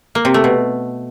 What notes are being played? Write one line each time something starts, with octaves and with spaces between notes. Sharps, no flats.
A#3
C3
A3
B2